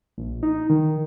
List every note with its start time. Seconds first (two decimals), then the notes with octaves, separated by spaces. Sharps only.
0.18 A#1
0.43 D#4
0.70 D#3